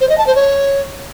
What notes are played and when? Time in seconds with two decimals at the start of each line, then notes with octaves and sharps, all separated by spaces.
0.01 C5
0.09 D#5
0.18 A5
0.27 C5
0.35 C#5